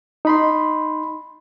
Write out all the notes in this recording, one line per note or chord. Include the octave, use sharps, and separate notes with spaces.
D#4 B5 C6